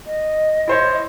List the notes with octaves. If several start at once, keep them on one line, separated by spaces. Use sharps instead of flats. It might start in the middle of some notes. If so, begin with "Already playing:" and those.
D#5
E4 C5 C#5